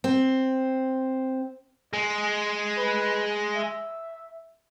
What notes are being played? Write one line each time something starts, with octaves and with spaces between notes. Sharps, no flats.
C4
G#3 D#5
B4
E5